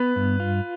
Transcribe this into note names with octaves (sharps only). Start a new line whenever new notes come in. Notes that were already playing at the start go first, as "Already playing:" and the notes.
Already playing: B3 B4
G2
F4